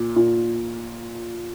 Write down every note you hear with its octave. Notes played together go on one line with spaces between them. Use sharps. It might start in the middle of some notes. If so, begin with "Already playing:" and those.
Already playing: A#2
A#2